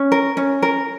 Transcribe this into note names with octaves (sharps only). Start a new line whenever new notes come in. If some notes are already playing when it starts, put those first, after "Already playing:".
Already playing: C#4
A#4
C#4
A#4